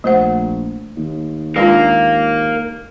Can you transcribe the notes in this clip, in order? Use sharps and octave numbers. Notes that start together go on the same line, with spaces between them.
A#1 A3 C5 F#5
D#2
G#3 D4 F4 A#4 F5